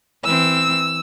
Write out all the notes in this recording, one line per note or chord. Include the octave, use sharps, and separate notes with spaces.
E3 C4 E6